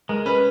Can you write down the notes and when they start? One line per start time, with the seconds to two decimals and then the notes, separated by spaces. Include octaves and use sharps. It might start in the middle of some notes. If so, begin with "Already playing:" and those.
0.09 G#3 A#4
0.26 C#4 B4